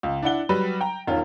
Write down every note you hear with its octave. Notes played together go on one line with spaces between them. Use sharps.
C#2
D4 E4 F#5 G7
F#3 G3 B4
G5 A#5
E1 D#3 C#4 F4